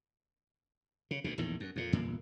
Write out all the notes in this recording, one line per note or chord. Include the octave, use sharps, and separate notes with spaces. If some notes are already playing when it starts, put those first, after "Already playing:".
C#3
D2 B2
A#1 E2 A2 D#3
F#2
F2 A#2
G1 E2 A#2 A#3